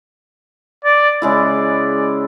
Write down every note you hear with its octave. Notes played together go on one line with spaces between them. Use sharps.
D5
C#3 G#3 E4 D5